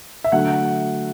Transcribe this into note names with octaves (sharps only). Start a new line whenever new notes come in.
E5
D3 F#3 A3 F#5